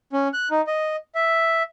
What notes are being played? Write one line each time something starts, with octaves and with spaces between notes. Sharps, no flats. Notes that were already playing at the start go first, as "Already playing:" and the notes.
C#4
F#6
D#4
D#5
E5